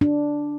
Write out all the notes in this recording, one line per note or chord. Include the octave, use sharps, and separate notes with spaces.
D4